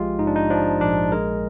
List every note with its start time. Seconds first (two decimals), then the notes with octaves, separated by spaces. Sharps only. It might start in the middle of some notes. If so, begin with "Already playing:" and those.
Already playing: A#1 F3 G#3 F4 G4
0.19 G#2 D#4
0.27 D4
0.36 D#4
0.50 F3 D4
0.81 A#1 D4
1.12 G#3 A#4